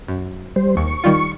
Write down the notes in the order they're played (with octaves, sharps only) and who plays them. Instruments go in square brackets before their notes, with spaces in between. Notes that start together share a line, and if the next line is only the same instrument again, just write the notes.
[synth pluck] F#2
[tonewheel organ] G3 C5
[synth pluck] D#2 [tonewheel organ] C#6
[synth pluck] D#3 G3 F4